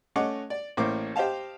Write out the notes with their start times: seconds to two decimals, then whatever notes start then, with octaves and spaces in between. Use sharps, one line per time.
0.16 A3 C#4 D#5 F#5 D6
0.50 D5
0.77 A1 A2 A#3 C5 D6
1.16 G4 C5 D#5 F5 A5